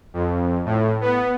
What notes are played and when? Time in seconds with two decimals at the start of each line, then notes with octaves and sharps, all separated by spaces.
0.14 F2
0.65 A2
1.01 B3